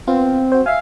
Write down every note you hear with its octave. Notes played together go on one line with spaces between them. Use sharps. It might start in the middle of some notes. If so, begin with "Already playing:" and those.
B3 C4 F4
F#4 C5
E5 F5 G#5